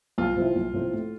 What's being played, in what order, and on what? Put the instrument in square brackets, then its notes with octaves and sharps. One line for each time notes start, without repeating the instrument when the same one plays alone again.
[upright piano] C2 [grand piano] F4
[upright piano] C3 F3 C4 E4
C2
C3 F3 C4 E4
A2